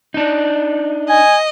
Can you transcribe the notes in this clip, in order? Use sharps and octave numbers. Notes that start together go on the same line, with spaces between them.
D4 D#4
D#5 G#5